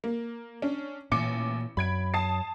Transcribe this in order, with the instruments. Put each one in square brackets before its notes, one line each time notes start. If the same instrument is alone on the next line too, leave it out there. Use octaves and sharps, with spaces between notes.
[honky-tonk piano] A#3
C#4 D4
[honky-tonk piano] A1 D6 C#7 [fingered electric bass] A#2
[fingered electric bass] F#2 [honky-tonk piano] B5 G#6 D7
[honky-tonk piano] A5 D#6 C7